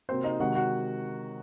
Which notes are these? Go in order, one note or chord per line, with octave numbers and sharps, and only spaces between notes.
C3 F#3 A#3 C4 C5
D#4 D#5
C3 D#3 G#3 F#4 F#5
F#4 F#5